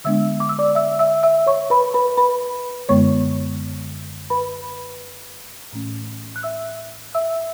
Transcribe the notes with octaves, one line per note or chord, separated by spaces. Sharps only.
D3 G#3 B3 D4 E5 E6
D6
E6
D5 D6
E5 E6
E5 E6
E5 E6
C#5 C#6
B4 B5
B4 B5
B4 B5
F#2 D3 G#3 B3 C#5 C#6
B4 B5
A2 E3 A3 C#4
F#6
E5 E6
E5 E6